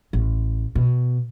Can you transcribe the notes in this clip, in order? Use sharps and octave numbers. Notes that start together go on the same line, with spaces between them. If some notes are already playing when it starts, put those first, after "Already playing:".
A1
B2